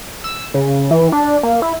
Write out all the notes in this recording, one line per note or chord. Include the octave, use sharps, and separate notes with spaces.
E6
C#3
E3
D4
A#3
E4